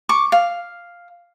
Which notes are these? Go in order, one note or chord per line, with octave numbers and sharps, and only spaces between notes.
C#6 D6
F5